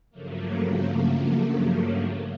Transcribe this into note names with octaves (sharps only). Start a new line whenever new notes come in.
G2 C#3 F3 F#3 A3 A#3